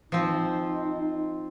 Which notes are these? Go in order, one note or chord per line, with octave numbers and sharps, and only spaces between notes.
F3 C4 D#4